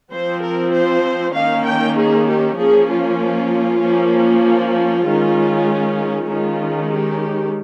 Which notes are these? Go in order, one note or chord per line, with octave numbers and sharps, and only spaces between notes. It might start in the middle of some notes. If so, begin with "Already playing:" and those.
F3 C4 C5
A#4
C5
D#3 A#3 C#4 F5
G5
G#4
G4
F3 A#3 C#4 G#4
F4
F3 A#3 C#4
F4
F4
D#3 G#3 C#4
D#3 G#3 C#4 F4
G4